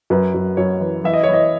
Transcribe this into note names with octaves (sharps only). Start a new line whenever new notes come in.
F#2 B4
F#2
F#2 C#5
E3
E3 E5
D#5
C#5
E3 D#5